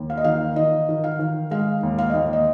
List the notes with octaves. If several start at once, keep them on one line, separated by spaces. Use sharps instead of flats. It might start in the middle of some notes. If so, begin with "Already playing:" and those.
Already playing: D#2
F5
D#5
D#3 F5
D#3 D#5
D#3
F5
D#3
G#3 F5
D#2
F5
D#2 D#5
D#5